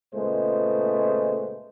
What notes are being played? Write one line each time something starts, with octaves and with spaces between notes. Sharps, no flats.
C#2 A#2 G#3 A3 B3 C5